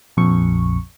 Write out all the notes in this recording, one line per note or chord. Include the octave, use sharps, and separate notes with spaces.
A#1 F2 C#6